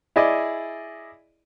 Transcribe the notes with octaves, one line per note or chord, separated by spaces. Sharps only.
E4 G#4 D5 D#5